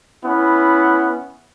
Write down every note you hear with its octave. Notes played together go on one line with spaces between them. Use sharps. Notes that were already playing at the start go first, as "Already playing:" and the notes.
B3 C#4 E4